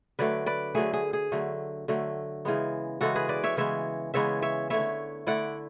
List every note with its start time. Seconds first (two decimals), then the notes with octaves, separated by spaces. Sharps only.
0.19 D3 F#3 A3 B4 D5
0.46 B4 D5
0.75 D3 F#3 A3 G#4
0.94 G#4
1.13 G#4
1.32 D3 F#3 A3
1.88 D3 F#3 A3
2.45 C#3 E3 G#3 B3
3.01 C#3 E3 G#3 B3 F#4 A4
3.16 G#4 B4
3.29 B4 D5
3.43 C#5 E5
3.57 C#3 E3 G#3 B3 C#5 E5
4.14 C#3 E3 G#3 B3 C#5 E5
4.42 C#5 E5
4.70 D3 A3 E4 C#5 E5
5.27 D3 A3 E4 D5 F#5